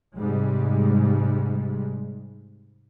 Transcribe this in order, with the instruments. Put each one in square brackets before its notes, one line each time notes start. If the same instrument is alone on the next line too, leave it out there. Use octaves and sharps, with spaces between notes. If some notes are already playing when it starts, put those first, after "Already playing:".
[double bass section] G#2 C3 G3 G#3